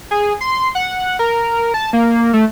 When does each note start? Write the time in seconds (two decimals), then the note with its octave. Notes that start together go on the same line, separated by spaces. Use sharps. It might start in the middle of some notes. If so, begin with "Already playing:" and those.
0.11 G#4
0.41 C6
0.75 F#5
1.19 A#4
1.74 A5
1.93 A#3
2.33 A3